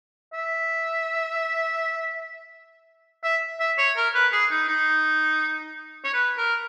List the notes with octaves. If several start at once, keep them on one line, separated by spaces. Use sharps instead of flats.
E5
E5
E5
C#5
A#4
B4
G#4
D#4
D#4
C#5
B4
A#4